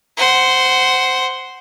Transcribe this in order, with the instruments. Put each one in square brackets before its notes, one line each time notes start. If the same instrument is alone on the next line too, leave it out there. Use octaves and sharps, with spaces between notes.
[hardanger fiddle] C5 F#5